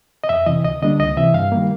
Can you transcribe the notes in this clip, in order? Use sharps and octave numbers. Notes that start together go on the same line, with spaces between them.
D#5
F2 E5
C3 E3 D#5
D2 D#5
D3 G3 A#3 D4 D#5
C#2 D#5
C3 E3 E5
G2 F5
D#3 G3 A#3